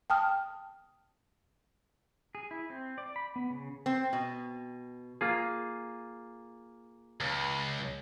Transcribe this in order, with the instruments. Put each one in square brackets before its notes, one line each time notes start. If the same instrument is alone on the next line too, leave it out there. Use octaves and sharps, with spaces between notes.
[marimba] G5 A5 D#6 F6
[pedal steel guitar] G#4
E4
C4
D5
B5
B3
C#3
[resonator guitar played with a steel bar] C4
B2
[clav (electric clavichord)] A#3 F4 G#4
[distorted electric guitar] C#2